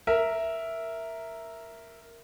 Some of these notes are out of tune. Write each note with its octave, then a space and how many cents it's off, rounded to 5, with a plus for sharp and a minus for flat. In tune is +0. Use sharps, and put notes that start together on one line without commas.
A#4 -5 E5 +0